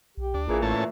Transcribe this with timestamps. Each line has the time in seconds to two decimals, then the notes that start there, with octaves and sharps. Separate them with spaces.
0.17 B1 G4
0.34 D2 D4
0.49 A1 A#2 E3 G#4
0.62 A2 A3 C#4 A5